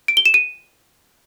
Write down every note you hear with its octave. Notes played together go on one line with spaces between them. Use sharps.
D7
G7
E7
D#7